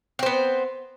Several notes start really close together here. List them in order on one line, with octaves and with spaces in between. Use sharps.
C4 C5 B3